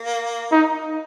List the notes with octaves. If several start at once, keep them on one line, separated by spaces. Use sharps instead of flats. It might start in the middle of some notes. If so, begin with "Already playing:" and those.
Already playing: A#3
D#4